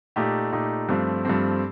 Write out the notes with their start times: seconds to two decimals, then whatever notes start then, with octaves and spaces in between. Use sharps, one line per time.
0.16 A#2 A3 D#4 G4
0.52 A#2 A3 D#4 G4
0.89 G2 F3 A3 C4
1.25 G2 F3 A3 C4